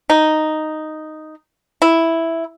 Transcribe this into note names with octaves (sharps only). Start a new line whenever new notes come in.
D#4
E4